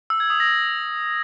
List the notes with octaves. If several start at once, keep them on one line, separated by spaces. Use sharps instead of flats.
E6
G#6
D#6
A#6